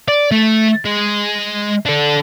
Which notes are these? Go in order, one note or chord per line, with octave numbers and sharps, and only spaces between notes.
D5
A3
G#3
D4 A4